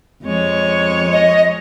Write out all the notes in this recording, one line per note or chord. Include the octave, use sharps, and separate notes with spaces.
F2 G#3 C#5
D#5